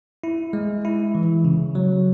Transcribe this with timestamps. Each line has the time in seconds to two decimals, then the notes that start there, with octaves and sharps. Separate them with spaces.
0.24 E4
0.53 G#3
0.85 E4
1.15 E3
1.45 C#3
1.75 F#3